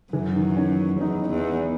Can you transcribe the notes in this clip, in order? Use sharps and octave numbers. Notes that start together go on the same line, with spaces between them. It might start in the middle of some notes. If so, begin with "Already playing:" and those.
F#2 E3
D#3
C#4
E2 D#4
E2